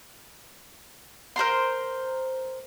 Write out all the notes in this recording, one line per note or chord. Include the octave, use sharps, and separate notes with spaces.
A#4 C5 A#5 C6